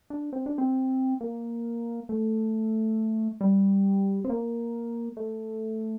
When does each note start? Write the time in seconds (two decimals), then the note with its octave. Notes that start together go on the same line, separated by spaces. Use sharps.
0.10 D4
0.33 C4
0.46 D4
0.58 C4
1.21 A#3
2.09 A3
3.41 G3
4.24 C4
4.30 A#3
5.17 A3